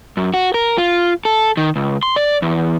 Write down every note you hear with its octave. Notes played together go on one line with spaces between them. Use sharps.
F#2
F#4
A#4
F4
A4
D#3
C#2
C6
D5
E2